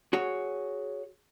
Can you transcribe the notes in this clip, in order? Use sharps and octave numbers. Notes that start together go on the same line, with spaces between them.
F#4 G#4 C#5